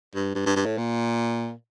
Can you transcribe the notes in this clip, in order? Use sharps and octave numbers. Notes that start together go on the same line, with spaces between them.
G2
G2
G2
G2
A2
A#2